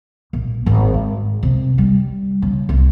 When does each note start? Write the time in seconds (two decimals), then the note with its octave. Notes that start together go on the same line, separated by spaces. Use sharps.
0.33 A#1
0.66 G#1
0.94 G#3
1.43 C3
1.78 G3
2.42 C#3
2.69 C2